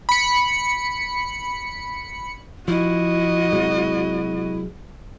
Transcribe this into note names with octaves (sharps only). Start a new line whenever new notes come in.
B5 C#7
F3 E4 F#4 D#5
C3 F#3 G#3